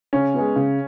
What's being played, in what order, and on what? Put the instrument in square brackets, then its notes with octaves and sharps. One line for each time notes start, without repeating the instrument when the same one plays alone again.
[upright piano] C#3 [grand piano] C#4
[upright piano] G#3 B3
C#3